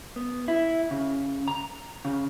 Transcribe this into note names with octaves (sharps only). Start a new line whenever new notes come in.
B3
E4
C#3
A#5
C#3